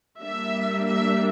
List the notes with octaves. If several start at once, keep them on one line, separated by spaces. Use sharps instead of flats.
G3 A#3 D4 E5
E5